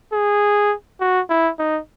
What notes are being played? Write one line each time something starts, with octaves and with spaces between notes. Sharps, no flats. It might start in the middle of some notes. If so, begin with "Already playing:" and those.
G#4
F#4
E4
D#4